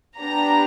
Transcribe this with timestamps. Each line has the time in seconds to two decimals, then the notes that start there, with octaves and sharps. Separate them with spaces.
0.20 B3 D4 G4 A#5